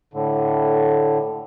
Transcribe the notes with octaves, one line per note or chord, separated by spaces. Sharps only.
A2 D3